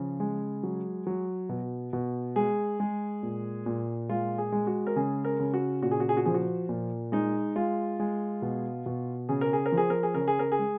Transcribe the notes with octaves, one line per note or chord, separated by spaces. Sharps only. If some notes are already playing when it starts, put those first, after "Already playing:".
Already playing: C#3 F3
G#3
F#3
F#3
B2
B2
G#3 G#4
G#3
A#2
A#2
G#3 F4
G#4
G#3
F#4
A#4
C#3 G#4
A#4
C#3
F#4
A#2 F#4
G#4
F#4
G#4
F#4
F3 G#4
F#4
A#2
G#3 D#4
G#3 F4
G#3
B2
B2
C#3 G#4
A#4
G#4
A#4
F3
G#4
A#4
G#4
C#3 A#4
G#4
A#4
G#4
G#3